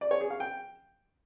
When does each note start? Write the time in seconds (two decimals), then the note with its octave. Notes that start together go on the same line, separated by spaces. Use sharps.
0.01 D5
0.11 C#5
0.21 G#4
0.30 F5
0.40 G5